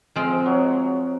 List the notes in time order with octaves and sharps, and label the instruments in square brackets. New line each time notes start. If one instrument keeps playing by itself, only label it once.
[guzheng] F3 C4 F4 [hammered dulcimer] G#3
[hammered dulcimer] F#3